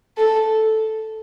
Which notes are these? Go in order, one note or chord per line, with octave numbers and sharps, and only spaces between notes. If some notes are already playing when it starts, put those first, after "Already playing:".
A4